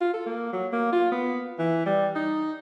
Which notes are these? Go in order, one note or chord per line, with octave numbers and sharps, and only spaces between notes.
F4
A4
A#3
F#3
A#3
F4
B3
E3
G3
D#4